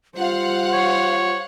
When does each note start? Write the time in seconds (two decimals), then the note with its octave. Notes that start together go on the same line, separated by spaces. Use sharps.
0.16 G3 F4 C5 F5 F#5
0.73 C#5